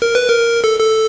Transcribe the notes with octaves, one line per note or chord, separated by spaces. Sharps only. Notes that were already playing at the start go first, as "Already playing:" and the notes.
A#4
B4
A#4
A4
A4